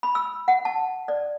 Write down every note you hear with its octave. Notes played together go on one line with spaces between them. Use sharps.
B5
E6
F#5
A5
D5